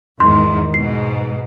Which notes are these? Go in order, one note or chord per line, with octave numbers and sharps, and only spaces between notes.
E2 G#2 D#3 C6
G#2 B2 C7